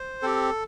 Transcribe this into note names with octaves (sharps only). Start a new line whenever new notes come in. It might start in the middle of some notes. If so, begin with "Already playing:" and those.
Already playing: C5
C4 G4 A4